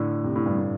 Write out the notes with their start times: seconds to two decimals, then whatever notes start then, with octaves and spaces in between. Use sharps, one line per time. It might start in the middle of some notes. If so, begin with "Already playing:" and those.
Already playing: A2 D3
0.24 C3
0.36 A2
0.46 G2
0.58 A2